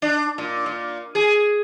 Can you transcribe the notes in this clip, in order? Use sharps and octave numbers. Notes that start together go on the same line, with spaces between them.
D4
A#2
A#2
G#4